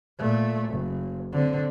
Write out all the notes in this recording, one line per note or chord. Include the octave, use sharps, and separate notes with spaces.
A#2 A3
F#1
D3 C4